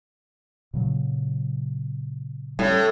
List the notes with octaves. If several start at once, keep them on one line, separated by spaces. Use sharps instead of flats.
A#2 C#3 F#3
A2 G3 C#4